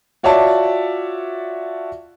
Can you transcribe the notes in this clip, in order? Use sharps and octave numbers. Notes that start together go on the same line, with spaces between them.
F4 F#4 C#5 D5 E5 A5